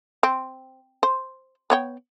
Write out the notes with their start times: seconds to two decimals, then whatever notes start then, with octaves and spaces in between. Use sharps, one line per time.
0.23 C4
1.03 C5
1.70 B3 C#5 G5